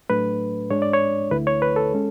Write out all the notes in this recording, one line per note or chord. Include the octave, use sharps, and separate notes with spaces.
A2 F#3 A3 D4 B4
G#2 G#3 D4 C#5
D5
C#5
D2 D3 A3 E4 B4
C#5
B4
A4
G#3 C#4